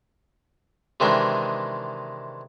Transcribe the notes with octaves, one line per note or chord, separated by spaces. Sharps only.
C3 D#3 E3 G#3 D4